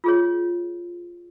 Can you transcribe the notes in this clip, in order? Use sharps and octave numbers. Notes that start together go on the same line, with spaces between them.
F4 G#4 C#5